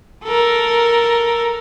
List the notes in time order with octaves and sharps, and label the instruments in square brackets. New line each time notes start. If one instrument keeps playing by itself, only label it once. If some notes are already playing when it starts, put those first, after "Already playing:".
[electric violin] A4 A#4